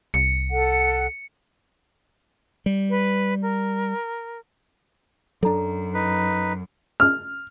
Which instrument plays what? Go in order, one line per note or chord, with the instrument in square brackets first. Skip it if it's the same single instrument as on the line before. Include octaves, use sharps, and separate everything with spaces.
[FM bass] C2 [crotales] C#7
[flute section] A4 F#5
[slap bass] G3
[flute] B4
A#4
[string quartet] F#2 [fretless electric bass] F#3 D4 [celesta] A4 A#5
[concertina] D#4 B4
[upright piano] F6